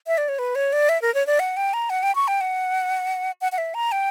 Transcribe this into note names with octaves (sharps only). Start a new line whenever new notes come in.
E5
D5
C#5
B4
C#5
D5
E5
A#4
C#5
D5
F#5
G5
A#5
F#5
G5
C#6
G5
F#5
F#5
F#5
E5
A#5
G5